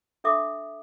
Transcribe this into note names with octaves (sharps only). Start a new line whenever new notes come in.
D4 A4 E5 D6 D#6